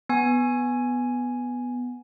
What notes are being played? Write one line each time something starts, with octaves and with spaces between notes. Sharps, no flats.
B3 G#5